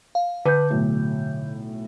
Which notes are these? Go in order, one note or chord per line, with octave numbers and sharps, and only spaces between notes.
F5
D3 B4 G6
B1 A2